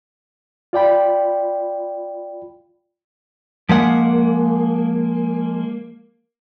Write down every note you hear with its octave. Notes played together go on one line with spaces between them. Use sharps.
F4 D5 G5 B5
F3 G#3 A#3 F#5